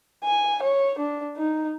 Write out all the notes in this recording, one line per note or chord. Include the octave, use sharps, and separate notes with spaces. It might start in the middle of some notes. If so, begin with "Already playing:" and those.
G#5
C#5
D4
D#4